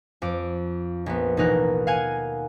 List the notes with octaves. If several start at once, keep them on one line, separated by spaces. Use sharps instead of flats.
F2 D6 D7
A#1 B3
A1 D#2 B2 D#4 A#4 F#6
F5 F#5 G#5 G#6 D#7